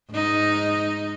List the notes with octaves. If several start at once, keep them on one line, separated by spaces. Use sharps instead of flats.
G#2 D#4